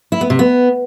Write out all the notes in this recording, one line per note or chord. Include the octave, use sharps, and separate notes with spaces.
E4
B3
C3
B3